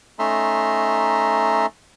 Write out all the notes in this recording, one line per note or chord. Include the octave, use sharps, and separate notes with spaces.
A3 C#4 D#4 E5 A#5 C6